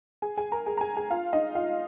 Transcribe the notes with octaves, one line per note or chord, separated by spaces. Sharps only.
G#4 G#5
G#4 G#5
A#4 A#5
G#4 G#5
A#5
G#4 G#5
G#4 G#5
F4 F5
D#4 D#5
F4 F5